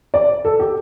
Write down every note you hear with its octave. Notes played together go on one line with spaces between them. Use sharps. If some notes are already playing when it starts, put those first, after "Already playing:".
D5
A4
G4